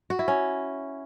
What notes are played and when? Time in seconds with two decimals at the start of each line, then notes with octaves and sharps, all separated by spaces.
0.10 F#4
0.19 E4
0.28 C#4